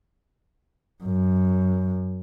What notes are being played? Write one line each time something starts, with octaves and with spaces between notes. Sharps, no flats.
F#2